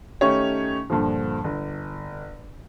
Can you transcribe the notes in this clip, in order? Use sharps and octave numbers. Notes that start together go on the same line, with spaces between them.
D#3 A3 C#4 D#4 G4 C#5
G2 A#2 D3 F3
G1